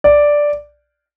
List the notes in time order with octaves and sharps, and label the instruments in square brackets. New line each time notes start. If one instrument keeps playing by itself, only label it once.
[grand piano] D5